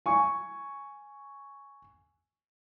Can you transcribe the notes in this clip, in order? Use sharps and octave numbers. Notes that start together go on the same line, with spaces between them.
G#5 C#6